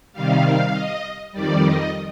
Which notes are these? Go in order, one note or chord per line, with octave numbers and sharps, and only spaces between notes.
C3 D#3 G3 F5
D#5
F2 D#3 G3 D5
D#5